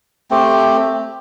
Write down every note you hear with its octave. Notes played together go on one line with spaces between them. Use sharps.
A3 C4 G4